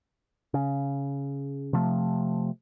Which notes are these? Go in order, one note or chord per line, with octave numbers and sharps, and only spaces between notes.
C#3
C3 F3 A3